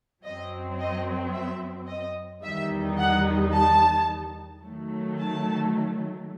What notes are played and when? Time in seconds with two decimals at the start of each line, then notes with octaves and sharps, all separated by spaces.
0.24 F#2 F#3 C4 D#5
0.78 D#5
1.34 E5
1.88 D#5
2.43 E2 D#3 G3 D#4 E5
2.98 F#5
3.52 A5
4.63 D#3 F#3 A3
5.18 A5